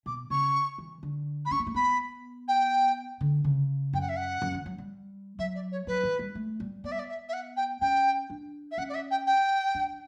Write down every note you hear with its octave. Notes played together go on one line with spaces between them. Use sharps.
B2 D6
C#3 C#6
E3
D3
B5
C#4 C#6
B3
A3
B3 B5
G5
D3
C#3
F#2 G5
F#5
E5
F#5
F#2
E3
F#3
G3
F#3 E5
D5
C#5
F#3 B4
E3
G3
A3
G3
B3 D5
E5
D5
E5
E5
F#5
G5
C#4 G5
D4
E5
C#4 F#5
D5
E5
G5
G5
D4